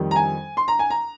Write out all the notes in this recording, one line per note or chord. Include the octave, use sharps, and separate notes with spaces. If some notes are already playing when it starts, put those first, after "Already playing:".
Already playing: F2 D#3 G3
A#5
G#5
C6
A#5
G#5
A#5